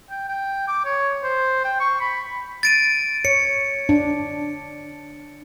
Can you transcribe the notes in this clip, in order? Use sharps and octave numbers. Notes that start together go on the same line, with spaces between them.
G5
G5
D6
C#5
C5
G5
C#6
B5
A6 D7 D#7
C#5 C#7
D4